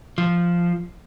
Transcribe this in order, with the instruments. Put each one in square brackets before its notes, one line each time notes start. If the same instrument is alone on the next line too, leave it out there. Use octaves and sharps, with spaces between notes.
[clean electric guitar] F3